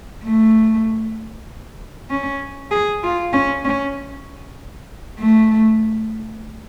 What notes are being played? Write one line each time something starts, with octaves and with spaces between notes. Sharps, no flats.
A3
C#4
G#4
F4
C#4
C#4
A3